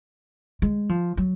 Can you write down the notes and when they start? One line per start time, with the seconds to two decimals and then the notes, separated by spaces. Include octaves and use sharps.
0.62 G#3
0.89 F3
1.17 F#3